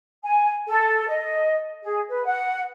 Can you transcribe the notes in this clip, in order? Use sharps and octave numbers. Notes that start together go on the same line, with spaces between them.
G#5
A4
D#5
G#4
B4
F#5